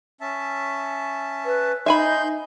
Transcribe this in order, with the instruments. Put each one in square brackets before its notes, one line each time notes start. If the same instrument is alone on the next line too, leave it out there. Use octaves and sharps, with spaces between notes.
[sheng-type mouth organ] C#4 E5 A5
[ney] B4
[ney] D#4 [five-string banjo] E5 G#5 B5 [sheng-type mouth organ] C6 G6